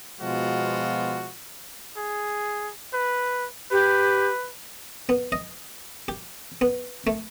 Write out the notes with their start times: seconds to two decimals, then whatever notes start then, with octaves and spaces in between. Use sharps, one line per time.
0.21 B2 F3 G#3 B3 F4 F#4
1.97 G#4
2.93 B4
3.71 G4 B4
5.09 B3
5.32 D#5
6.08 G4
6.61 B3
7.07 A3